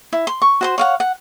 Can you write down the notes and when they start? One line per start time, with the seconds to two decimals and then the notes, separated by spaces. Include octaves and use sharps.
0.13 E4
0.27 C6
0.42 C#6
0.61 F#4 C5 C6
0.78 C#5 F5 F#5
1.00 F#5